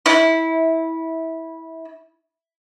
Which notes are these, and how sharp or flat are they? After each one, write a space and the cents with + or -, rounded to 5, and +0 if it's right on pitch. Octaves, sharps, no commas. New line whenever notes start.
E4 -20